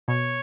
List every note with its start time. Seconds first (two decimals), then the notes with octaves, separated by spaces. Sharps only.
0.08 B2 C#5